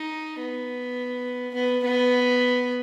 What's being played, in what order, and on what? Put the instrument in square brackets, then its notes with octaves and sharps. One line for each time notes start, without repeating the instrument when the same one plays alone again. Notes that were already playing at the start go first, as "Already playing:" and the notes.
Already playing: [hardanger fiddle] D#4
B3
B3
B3